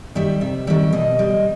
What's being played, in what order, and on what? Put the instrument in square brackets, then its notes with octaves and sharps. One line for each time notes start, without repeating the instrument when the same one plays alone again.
[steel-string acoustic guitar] D#3 G3 E5
C3 E5
D#3 G3 E5
B2 D#5
G3